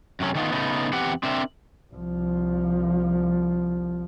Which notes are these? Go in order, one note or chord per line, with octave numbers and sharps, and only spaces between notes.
F#2 C3 F#3 C#4
D#3 F#3 A3 B3 D#4 F4
C#3 A3 B3 D#4
E2 C4 G4 B4 F#5
C4 D4 A#4 E5
C2 F3